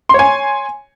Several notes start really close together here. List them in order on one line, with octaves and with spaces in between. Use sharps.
C6 C#5 G#5